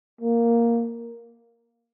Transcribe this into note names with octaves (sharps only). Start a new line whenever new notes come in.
A#3